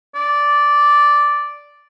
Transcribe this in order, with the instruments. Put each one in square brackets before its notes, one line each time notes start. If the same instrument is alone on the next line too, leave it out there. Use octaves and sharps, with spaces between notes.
[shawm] D5